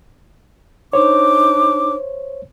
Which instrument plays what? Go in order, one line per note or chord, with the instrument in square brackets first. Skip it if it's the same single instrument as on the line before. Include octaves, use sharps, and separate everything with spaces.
[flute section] D4 D#4 D6 [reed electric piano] C5 C#5